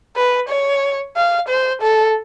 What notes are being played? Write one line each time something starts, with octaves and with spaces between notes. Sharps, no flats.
B4
C#5
F5
C5
A4